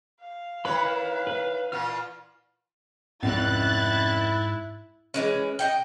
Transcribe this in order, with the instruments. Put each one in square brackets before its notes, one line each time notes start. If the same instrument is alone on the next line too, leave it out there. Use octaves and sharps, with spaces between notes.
[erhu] F5
[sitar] D#3 E4 C#5 [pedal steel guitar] B4 B5
[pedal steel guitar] B4
[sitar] A#2 E3 F4 [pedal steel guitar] F6
[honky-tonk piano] F1 C#2 [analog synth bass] G#2 [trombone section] E4 [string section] F#6 A6
[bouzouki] E3 G#3 C#4
D#5 F#5 G5